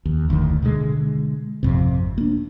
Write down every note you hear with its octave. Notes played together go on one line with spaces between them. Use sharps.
D#2
F1 D2 A2 D#3
B2 D3 F3 G#3
G#1 F2 C3
A#3 D4